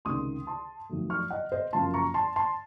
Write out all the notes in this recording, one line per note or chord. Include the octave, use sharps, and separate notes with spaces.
C#2 C3 D#3 C6 D#6
A5 C6
F2 D#3 F#3 A3
C#6 F6
D#5 F#5
C5 D#5
F#1 F#2 F3 A#3 A5 C6
A#5 C#6
A5 C6
A5 C6